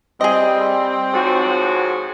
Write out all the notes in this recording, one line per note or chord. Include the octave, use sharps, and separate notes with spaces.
G3 C4 G#4 D#5
F2 G#2 F#4 C#5